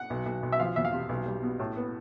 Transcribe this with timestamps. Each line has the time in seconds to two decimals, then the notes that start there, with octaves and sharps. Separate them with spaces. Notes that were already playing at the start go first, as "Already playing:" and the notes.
Already playing: F#5
0.10 B1
0.26 B1
0.43 B1
0.52 E5
0.60 F3 F5
0.76 E2 E5
0.85 F5
0.93 C3
1.09 B1
1.26 G3
1.43 B2
1.59 A2
1.76 B3